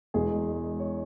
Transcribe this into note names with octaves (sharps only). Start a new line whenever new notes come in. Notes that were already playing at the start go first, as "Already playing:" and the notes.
E1 E2 B2 G#3 G#4
C#5